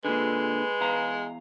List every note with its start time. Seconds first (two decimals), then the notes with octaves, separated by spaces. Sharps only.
0.05 A#2 D3 G#3 B4
0.81 E2 F5 A#5